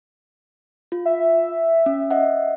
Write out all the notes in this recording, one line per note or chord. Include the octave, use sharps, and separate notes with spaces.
F4
E5
C#4
D#5 E5 F#5